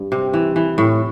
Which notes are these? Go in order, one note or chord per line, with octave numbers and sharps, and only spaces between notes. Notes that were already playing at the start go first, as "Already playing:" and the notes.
Already playing: G2
C3
E3
E3
A2